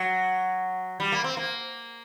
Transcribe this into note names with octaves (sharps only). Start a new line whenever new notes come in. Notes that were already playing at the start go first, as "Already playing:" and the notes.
Already playing: F#3
G3
A#3
C4
A#3